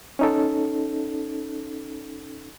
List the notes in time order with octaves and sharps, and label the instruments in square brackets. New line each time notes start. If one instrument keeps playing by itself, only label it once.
[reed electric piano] C#4 D#4 A4